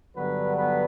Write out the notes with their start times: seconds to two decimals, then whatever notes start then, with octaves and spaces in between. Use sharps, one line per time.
0.16 G2 D3 F#3 B3 B4
0.57 B3 B4